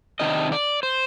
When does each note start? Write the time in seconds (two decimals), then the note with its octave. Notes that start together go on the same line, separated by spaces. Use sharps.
0.20 C3 D#3 D4 D#5
0.52 D5
0.83 C5